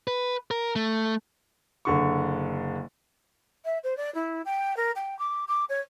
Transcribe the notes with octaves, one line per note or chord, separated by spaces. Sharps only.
B4
A#4
A3
F#1 D3 C#6
E5
C5
D5
E4
G5
A#4
G5
D6
D6
C#5